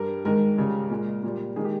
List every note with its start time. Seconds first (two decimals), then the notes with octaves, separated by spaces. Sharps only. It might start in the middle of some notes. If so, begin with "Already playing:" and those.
Already playing: G2 G3 A#4
0.25 G#2 D#3 G#3 A#4
0.57 C#2 C#3 G3
0.90 A#2 G#3
1.23 A#2 G3
1.56 D#3 G#3 G#4
1.65 G4